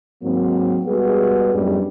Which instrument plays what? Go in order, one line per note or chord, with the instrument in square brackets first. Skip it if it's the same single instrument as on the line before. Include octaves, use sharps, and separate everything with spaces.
[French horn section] G#2 D#3 F#3 A#3 C4
G3 G#3 B3 F#4 G#4
F#2 A2 G3 G#3 B3 D4